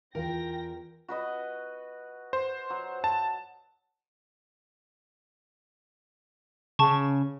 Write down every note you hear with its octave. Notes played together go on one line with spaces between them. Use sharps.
E2 F4 A#4 G5 A#6
F#4 B4 D#5
C5
F#3
A5
C#3 A5 C#6